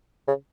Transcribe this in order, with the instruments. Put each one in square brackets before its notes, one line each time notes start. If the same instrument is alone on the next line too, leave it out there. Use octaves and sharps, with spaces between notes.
[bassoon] C#3